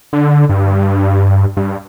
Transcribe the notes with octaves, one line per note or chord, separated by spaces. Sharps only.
D3
G2
G2